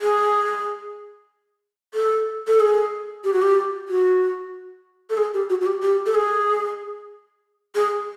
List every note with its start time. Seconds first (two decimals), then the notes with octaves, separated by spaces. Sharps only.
0.01 G#4
1.94 A4
2.47 A4
2.60 G#4
3.24 G4
3.33 F#4
3.42 G4
3.88 F#4
5.10 A4
5.17 G#4
5.34 G4
5.50 F#4
5.61 F#4
5.66 G4
5.82 G4
6.06 A4
6.15 G#4
7.75 G#4